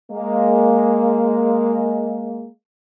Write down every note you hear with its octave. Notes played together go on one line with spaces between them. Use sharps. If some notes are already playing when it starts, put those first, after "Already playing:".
G#3 A#3